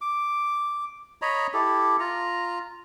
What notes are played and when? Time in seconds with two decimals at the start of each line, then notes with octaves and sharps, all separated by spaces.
0.01 D6
1.22 C#5 D#5 A#5 B5
1.54 E4 G4 A4
2.00 F4 A#5